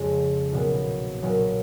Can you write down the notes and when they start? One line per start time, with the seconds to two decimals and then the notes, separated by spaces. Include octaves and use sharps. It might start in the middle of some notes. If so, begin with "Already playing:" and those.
Already playing: F2 C#3 G#3
0.52 B1 A#2 F#3 B3
1.21 B1 A#2 F#3 B3